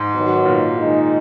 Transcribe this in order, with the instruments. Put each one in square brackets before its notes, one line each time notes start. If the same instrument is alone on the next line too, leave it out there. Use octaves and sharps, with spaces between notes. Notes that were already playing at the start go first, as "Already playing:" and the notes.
Already playing: [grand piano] G#2
[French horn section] D#3 F#3 B3 F#4
[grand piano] A#2
[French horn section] D#3 G#3 D#4